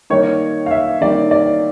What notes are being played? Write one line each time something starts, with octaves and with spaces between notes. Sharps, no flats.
D#3 G3 A#3 D#4 C#5
F5
E5
D#3 G3 A#3 D#4 D5
D5